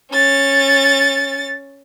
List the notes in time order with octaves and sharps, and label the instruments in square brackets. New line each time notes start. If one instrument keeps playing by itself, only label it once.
[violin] C#4 A6